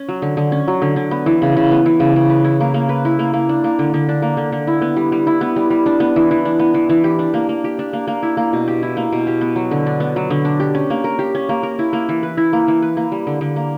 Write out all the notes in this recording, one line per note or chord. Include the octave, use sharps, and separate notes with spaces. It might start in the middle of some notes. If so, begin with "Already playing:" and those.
Already playing: C#4
F#3
D3
D3
C#4
F#3
D3
D3
B3
E3
C#3
C#3
B3
E3
C#3
C#3
B4
E4
A#3
A#3
B4
E4
A#3
A#3
D4
A#3
D3
D3
D4
A#3
D3
D3
E4
B3
G3
G3
E4
B3
G3
G3
D4
B3
E3
E3
D4
B3
E3
E3
G4
D4
A#3
A#3
G4
D4
A#3
A#3
E4
A#3
B2
G4
E4
A#3
B2
G4
B3
F#3
D3
D4
B3
F#3
D3
D4
G4
C#4
A#3
A#4
G4
C#4
A#3
A#4
E4
A#3
E3
B4
E4
A#3
E3
B4
A#3
G3
D3
D3
A#3